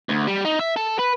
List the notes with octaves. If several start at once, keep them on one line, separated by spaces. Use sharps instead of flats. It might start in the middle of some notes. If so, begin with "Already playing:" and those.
D2
G3
D#4
E5
A4
B4